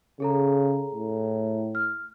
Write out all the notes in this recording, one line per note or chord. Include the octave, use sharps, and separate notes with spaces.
C#3 G#4 A4 A#5
A2
F6